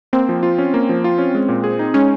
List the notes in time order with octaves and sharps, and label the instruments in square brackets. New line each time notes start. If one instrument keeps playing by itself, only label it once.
[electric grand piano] A#3 [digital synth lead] C4
[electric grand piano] F3
F4
C#4
A#3
F3
F4
C#4
G#3
A#2
G#4
D#4
[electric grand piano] G#3 [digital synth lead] C#4